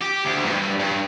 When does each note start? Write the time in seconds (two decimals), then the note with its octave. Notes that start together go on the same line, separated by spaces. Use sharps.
0.01 G4
0.25 D2
0.46 G2
0.79 G2